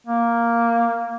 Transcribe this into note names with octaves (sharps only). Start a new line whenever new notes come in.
A#3